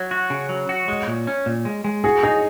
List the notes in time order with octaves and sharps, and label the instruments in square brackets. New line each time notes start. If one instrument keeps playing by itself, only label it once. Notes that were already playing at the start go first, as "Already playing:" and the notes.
Already playing: [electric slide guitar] F#3 [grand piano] C#5
[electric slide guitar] F#4
C#3
F#3
F#4
G#3
A#2
C#4
A#2
G#3
G#3
[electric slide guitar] F#4 [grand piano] G#4
[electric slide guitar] D#4 [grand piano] G#4